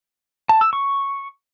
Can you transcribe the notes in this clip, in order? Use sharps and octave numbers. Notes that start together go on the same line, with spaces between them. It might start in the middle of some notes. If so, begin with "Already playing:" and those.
A5
E6
C#6